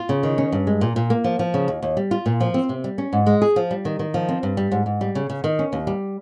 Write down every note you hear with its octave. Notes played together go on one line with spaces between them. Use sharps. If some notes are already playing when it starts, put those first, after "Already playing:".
Already playing: F4
C#3
D#3
C#4
G2
G#3
A#2
A#2
A#3
F3
F3
C#3
D#2
D#2
G3
F4
A#2
F3
C4
C3
G3
C#4
G#2
G#3
G#4
F3
G3
D#3
D#3
F3
C4
G2
G3
G#2
G#2
G3
C#3
C#3
D#3
C#4
D#2
G3